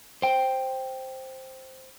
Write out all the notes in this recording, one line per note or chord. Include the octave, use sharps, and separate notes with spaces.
C5 G5